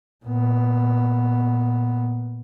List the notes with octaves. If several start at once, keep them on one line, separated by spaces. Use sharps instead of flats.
A#2 B3